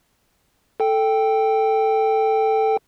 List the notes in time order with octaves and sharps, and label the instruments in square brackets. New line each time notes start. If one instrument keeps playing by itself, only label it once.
[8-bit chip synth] A4 G5